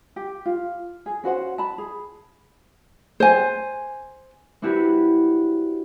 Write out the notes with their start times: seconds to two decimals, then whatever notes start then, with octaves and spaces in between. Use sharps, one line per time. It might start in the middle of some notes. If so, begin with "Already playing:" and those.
0.16 G4
0.46 F4
1.06 G#4
1.24 C#4 F#4 C5 F#5
1.58 A5 B5
1.78 G#4
3.20 C5 G#5
4.62 C4 D4 E4 F#4 G4 B4